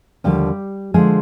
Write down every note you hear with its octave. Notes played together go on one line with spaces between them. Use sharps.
D#2 D3 F3 G3 G4
D3 F3 G#3 G#4